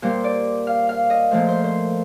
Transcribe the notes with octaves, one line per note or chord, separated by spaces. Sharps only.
A#2 G3 C5
D5
F5
F5
D#5
A#2 F3 A3 C5
C5
C5